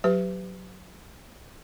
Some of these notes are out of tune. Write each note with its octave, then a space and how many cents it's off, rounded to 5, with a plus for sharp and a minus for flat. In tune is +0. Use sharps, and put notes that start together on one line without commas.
F#3 +0 G4 +0 B4 +30